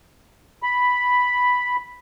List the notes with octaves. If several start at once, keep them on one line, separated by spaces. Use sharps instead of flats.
B5